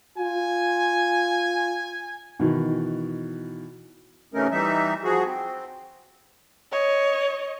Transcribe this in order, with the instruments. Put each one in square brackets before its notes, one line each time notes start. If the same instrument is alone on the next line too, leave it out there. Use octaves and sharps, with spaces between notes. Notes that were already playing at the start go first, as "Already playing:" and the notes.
[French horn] F4 [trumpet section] G#5
[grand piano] B2 D#3 E3
[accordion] C3 E3 A3 C#4 D#4 A#4
E3 G3 D#4 E5
F3 F#4 G#4
C4
[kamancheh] C#5 D#5